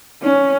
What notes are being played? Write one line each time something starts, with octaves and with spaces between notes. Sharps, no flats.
C#4